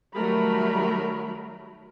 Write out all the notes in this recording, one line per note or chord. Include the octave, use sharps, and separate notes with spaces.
D#3 F#3 G3 A3 A#4 B5